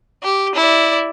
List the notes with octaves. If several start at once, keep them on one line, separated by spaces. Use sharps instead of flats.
G4
E4 D5